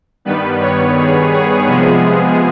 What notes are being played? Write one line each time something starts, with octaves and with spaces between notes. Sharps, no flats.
G2 D#3 G3 B3 B4
C#5
G#4
G#4
C3 F3 G#3 B3